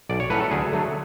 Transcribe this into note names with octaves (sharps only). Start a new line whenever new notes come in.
B1 D5
C#5
A2 F#3 C#4 B4
A4
D2 G#4
D3 F#3 A3